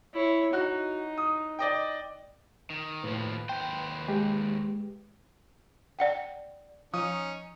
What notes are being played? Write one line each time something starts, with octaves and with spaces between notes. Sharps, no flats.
E4 C#5
D#4 F#4 F#6
D#6
D5 D#5 G5
D#3
D#2 A2 F3 B4
D#2 C5 G5
G#3 G4
D5 F#5 G5
F3 C#4 D#4 D#6